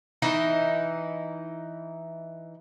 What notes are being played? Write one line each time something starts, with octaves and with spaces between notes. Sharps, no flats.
E3 D#4 E4